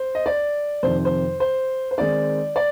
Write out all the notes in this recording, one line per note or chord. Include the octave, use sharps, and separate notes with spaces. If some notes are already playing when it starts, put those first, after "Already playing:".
Already playing: C5
D#5
D5
F2 C3 D#3 C5
C5
C5
C5
D#3 G#3 C4 D#4 D5
D5